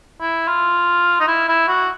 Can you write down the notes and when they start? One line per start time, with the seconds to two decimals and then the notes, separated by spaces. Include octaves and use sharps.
0.21 E4
0.48 F4
1.20 D#4
1.28 E4
1.48 E4
1.68 F#4